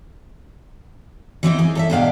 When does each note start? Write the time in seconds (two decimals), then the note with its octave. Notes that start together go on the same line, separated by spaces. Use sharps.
1.43 E3 C4 D#4 C5
1.59 G#4
1.75 A4 C#5 E5
1.90 G#2 B2 D4 B4 F5 G5